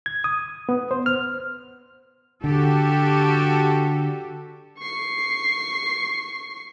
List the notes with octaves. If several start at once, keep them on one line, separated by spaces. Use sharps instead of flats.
G#6
D#6
B3
C5
F6
D3 F#4 G4 A4
C#6 C7